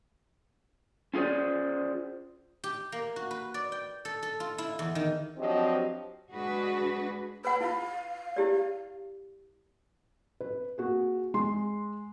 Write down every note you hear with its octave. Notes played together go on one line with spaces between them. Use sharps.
C#4 F4 G#4 C5 D5
G4
A#3
F#4
B4
D5
G5
A4
A4
F4
E4
E2
D#3
F3 F#3 C4 D4 G4 D#5
G#3 D4 F#4 G#4 B4
B4 F#5 B5
E4 F4 F5
E4 G4 D5
B4
A#3 F#4 G#4
G#3 C6